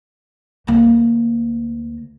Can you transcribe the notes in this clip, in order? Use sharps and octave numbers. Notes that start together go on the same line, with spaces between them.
D2 A#3